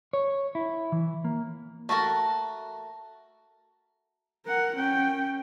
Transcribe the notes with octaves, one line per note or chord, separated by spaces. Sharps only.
C#5
E4
E3
A#3
A3 F#4 A4 A#4
A#4 F#5
C#4 G5